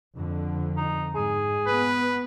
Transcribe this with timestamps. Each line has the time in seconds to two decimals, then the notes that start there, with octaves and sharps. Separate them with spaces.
0.14 F2 D3
0.77 D#4
1.15 G#2 G#4
1.67 B3 B4